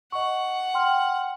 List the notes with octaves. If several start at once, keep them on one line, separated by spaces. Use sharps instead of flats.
D#5 F#5 C#6
G5 C6 F6